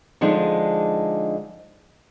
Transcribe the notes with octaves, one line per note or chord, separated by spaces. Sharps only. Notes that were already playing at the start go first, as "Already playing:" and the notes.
D3 F3 G#3 D4 D#4